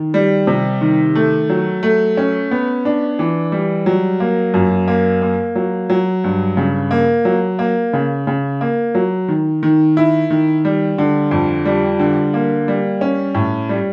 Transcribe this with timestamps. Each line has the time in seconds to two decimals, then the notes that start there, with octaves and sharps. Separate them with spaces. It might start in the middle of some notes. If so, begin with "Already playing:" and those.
Already playing: D#3
0.14 G3
0.47 C3
0.81 D#3
1.15 A3
1.49 F#3
1.83 A3
2.17 C#4
2.51 B3
2.85 D4
3.19 E3
3.52 G3
3.86 F#3
4.20 A#3
4.54 F#2
4.88 A#3
5.22 A#3
5.55 F#3
5.90 F#3
6.24 G2
6.57 C#3
6.91 A#3
7.25 F#3
7.59 A#3
7.93 C#3
8.27 C#3
8.61 A#3
8.95 F#3
9.28 D#3
9.63 D#3
9.97 E4
10.30 D#3
10.65 G3
10.98 D3
11.31 F2
11.65 G3
12.00 D3
12.34 A#3
12.68 G3
13.01 C#4
13.35 A2
13.69 G3